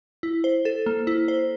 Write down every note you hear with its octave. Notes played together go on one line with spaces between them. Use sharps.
E4
C5
A4
A#3
E4
C5